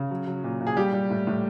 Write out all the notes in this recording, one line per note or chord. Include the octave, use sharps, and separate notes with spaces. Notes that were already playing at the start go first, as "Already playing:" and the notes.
Already playing: C#3
F#3
F#3
A#2
A#2
G#4
G3 G4
G3
A2
A2